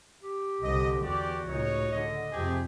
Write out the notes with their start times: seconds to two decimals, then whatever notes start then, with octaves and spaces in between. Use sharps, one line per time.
0.22 G4
0.61 C2 D3 D#5
1.02 E2 F#4 G4 D5
1.48 C#2 A2 D#4 C#5
1.92 D3 D#5
2.31 F2 C3 A3 G4 G#4